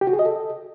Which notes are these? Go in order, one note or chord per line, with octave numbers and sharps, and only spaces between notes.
G4
F#4
G#4
D#5
A4